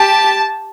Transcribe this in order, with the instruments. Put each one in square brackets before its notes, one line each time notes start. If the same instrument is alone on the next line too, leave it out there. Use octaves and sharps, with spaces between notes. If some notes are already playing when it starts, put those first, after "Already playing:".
Already playing: [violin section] G4 A5